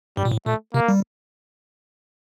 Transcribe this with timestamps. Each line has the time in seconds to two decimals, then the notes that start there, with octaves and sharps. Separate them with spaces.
0.17 G2 G3
0.25 A#2
0.32 A2
0.46 A#2 A3
0.74 C3 A#3
0.88 G3